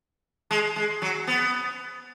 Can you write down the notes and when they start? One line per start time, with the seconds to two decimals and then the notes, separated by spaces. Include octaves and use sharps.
0.51 G#3
0.76 G#3
1.02 F#3
1.27 B3